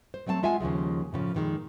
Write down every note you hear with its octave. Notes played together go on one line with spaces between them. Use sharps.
C5
F#3 A3 C4 G5 A5
G#3 F4 E5 F#5 G#5
D#2 C#3 F3 G#3
A2 C#3 E3 F3
F2 A#2 D#3 G3 G#3